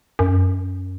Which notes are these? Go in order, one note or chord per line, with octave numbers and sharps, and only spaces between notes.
F#2